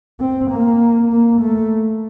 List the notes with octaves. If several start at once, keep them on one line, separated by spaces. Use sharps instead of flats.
C4
A#3
A#3
A3